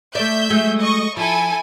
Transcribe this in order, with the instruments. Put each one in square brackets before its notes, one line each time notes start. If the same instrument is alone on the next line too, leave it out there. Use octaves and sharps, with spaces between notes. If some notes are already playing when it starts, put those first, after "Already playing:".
[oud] A3 D5 [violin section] E5 G6
[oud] F#3 G#3 A3
[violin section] D#5 C#6
[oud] F3 [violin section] E4 A4 G#5